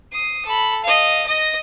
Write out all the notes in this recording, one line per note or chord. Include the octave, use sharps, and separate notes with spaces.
D#6 C7
A4 B5
D#5 F5
D#5 A#6